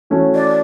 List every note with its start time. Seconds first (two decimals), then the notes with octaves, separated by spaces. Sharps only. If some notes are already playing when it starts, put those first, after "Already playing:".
0.10 E3 A3 C#4 F#4 A4
0.35 D5